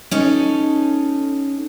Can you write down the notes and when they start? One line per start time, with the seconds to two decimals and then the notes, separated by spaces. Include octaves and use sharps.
0.11 C#4 D#4 A4